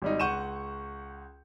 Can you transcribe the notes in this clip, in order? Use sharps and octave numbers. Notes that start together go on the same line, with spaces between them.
G#1 G3 D#4
C#2 F#5 C#6 G6 D#7 E7